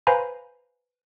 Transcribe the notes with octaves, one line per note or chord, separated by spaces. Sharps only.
B4 C5 F5 G#5 A#5 B5